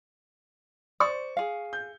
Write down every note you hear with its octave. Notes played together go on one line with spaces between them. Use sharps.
C5 D5 C#6
G#4 F5
G6